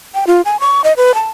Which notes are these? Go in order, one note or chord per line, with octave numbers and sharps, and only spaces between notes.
G5
F4
G#5
C#6
D#5
B4
A5